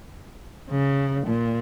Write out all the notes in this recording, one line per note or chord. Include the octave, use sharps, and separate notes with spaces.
C#3
A#2